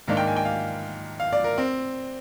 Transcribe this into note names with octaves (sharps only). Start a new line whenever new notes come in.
G#2 D#3 A#3 D4 F5
G5
G#5
G5
F5
F5
D5
A#4
C4